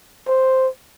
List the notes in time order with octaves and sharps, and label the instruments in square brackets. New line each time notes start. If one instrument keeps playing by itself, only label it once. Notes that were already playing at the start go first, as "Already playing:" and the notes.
[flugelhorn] C5